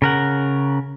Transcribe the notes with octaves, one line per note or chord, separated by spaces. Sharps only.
C#3 A#4 F#5